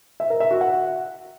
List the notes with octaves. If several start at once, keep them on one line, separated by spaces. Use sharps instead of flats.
E5
A#4
E5
F#4
F#5